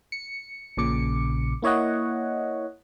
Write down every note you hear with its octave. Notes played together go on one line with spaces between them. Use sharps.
C#7
A#1 A#2 C#3 D6 C#7
A#3 E4 C#5 D#5 F#5